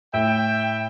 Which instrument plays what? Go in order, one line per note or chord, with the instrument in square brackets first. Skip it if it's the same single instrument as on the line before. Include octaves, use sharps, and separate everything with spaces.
[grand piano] A2 [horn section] E5 G5